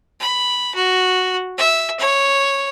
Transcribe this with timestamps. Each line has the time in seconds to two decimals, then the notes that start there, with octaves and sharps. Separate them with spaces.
0.20 B5
0.74 F#4
1.58 E5
1.99 C#5